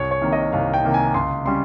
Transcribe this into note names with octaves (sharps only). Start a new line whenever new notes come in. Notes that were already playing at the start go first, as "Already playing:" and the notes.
Already playing: C2 C#5
C#5
C3 D#3 A#3
D#5
C2 F5
G5
C3 D#3 A#3
G#5
C#2 C6
C#3 G3 C#4 C6